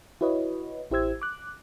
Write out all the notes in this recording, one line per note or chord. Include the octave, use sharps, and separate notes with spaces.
E4 F#4 B4 C#5 D#5
A1 E4 G4 C5 E6 G#6
D6 F#6